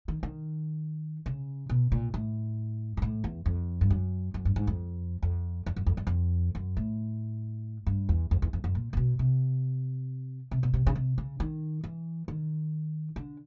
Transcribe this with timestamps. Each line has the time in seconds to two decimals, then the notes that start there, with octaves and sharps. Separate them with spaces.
0.08 D#3
0.23 D#3
1.26 C#3
1.69 B2
1.92 A#2
2.14 A2
2.97 G#2
3.02 A2
3.24 E2
3.46 F2
3.81 G2
3.90 F#2
4.34 F#2
4.45 G2
4.56 G#2
4.67 F2
5.23 F2
5.66 F2
5.76 F#2
5.86 F2
5.97 F#2
6.07 F2
6.55 F#2
6.77 A2
7.87 G2
8.09 E2
8.31 F2
8.42 E2
8.53 F2
8.64 F#2
8.75 A#2
8.93 A#2
8.97 B2
9.19 C3
10.51 C3
10.63 B2
10.74 C3
10.87 C#3
10.95 C3
11.18 C#3
11.40 D#3
11.84 E3
12.28 D#3
13.16 D3